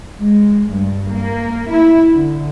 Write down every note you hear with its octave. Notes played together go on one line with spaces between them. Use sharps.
G#3
G2
A#3
E4
D3